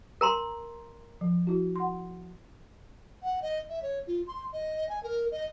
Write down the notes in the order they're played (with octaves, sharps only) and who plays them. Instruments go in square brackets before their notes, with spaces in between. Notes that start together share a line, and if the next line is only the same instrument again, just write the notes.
[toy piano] A#4 A#5 C6
[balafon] F3
E4 F#4
F#5 C6
[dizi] F#5
D#5
E5
C#5
F4
C6
D#5
G#5
A#4
D#5